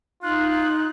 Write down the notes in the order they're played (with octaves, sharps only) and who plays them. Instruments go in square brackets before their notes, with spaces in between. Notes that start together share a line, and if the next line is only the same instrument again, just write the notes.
[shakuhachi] D#4 [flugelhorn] F4 [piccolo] F#6